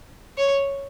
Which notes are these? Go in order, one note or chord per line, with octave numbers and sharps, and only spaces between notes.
C#5